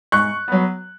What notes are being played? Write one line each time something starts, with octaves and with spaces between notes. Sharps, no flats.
G#2 C#6 F#6
F#3 B3